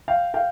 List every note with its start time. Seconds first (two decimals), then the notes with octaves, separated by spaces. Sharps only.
0.08 F5 G5
0.34 F5 G5